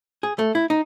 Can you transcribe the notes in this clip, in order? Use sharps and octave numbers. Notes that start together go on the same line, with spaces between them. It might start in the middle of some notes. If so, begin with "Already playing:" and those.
G#4
A3
E4
D#4